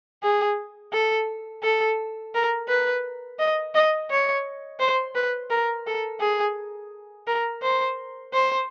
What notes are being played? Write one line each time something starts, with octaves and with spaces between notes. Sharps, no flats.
G#4
A4
A4
A#4
B4
D#5
D#5
C#5
C5
B4
A#4
A4
G#4
A#4
C5
C5